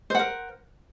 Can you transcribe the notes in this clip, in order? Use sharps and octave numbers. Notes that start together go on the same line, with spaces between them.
A#4 C5 F#5